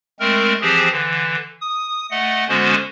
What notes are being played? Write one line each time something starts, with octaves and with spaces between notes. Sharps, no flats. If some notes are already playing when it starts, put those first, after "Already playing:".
G#3 A3 C4 A#4
E3 F3 C4 G4 G#4 C5
D3 E3
D#6
A3 D#5 F#5
D3 G#3 B3 C#4 F#4 C5